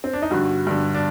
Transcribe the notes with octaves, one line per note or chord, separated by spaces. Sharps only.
C4
D4
D#4
G2 D3 F#4
G2 D3
D4